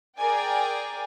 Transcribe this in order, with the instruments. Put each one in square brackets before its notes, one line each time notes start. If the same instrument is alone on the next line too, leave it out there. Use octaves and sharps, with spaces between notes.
[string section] G#4 A#4 D5 G5 G#5